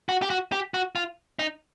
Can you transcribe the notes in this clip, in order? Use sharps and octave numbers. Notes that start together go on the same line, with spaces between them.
F#4
G4
F#4
G4
F#4
F4
D#4